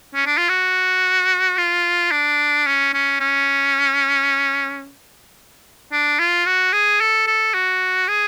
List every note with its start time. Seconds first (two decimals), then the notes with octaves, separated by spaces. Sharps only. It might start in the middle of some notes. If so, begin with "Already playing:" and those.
0.14 C#4
0.26 D4
0.38 F4
0.49 F#4
1.58 F4
2.11 D4
2.66 C#4
2.94 C#4
3.20 C#4
5.92 D4
6.19 F4
6.46 F#4
6.73 G#4
7.01 A4
7.27 A4
7.54 F#4
8.08 G#4